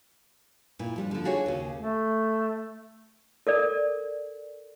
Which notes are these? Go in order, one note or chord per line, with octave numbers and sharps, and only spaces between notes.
A#2 E4
F3 G3 D4
D3 F3
D4 F4 F#4 G#4 A4 C#5
D#2 C#3
A3
A4 A#4 D5